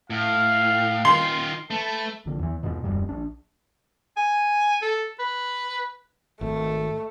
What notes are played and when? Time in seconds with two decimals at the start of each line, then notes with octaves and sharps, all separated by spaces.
0.10 A2 F5
1.05 D#3 F4 C6
1.70 A3 B4 A5
2.26 A#1 D3
2.39 E2 E3
2.63 E2 G#2 B2
2.84 D#1 C#2 F#2 G3
3.09 A#1 D4
4.17 G#5
4.82 A4
5.19 B4
6.41 G#1 A3